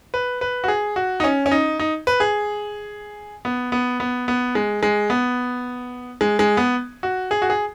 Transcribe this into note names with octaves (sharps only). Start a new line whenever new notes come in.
B4
B4
F#4
G#4
F#4
D#4
C#4
C#4
D#4
D#4
B4
G#4
B3
B3
B3
B3
G#3
G#3
B3
G#3
G#3
B3
F#4
G#4
F#4
G#4